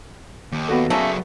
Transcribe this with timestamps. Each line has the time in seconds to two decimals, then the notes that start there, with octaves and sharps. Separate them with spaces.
0.52 D#2
0.68 B3 F#4 A4
0.90 F#3 A3 A#3 C#4 G#4